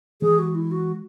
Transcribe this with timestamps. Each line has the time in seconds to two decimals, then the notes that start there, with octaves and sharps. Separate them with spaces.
0.22 E3 G#3 G#4
0.39 F#4
0.55 E4
0.71 F#4